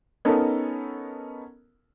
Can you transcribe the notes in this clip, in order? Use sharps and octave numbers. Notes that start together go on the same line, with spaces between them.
B3 C#4 D#4 A4 A#4